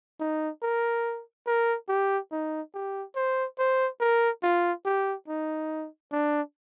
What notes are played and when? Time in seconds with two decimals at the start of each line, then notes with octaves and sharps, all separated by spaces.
0.20 D#4
0.63 A#4
1.47 A#4
1.89 G4
2.32 D#4
2.74 G4
3.16 C5
3.59 C5
4.00 A#4
4.43 F4
4.85 G4
5.28 D#4
6.12 D4